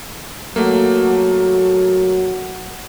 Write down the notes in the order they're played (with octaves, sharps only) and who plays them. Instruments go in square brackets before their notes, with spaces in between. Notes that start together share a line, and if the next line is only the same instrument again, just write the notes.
[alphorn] F#3 [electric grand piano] A3 A#3